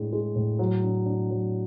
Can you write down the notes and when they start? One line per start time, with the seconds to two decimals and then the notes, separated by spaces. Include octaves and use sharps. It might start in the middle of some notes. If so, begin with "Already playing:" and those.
Already playing: A2 G#3 D4
0.13 G#3
0.35 A2
0.59 F#3
0.83 D4
1.06 D4
1.31 F#3